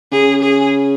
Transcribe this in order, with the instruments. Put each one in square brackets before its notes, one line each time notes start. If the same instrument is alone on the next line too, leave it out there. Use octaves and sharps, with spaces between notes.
[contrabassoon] C#3 [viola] G#4
[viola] G#4